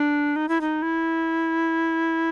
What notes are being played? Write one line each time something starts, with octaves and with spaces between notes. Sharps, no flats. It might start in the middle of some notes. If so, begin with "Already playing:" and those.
Already playing: D4
D#4
E4
D#4
E4